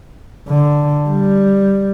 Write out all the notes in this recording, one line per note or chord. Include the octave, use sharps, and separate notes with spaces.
D3
G3